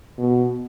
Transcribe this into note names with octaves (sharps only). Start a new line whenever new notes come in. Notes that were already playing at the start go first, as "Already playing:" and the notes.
B2